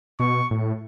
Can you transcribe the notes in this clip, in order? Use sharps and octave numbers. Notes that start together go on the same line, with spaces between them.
B2 C#6
A2